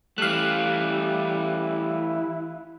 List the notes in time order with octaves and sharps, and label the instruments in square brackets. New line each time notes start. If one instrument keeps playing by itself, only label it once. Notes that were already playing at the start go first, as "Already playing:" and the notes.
[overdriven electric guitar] E3 A3 [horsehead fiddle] G3 [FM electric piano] F5 F#6
[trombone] E4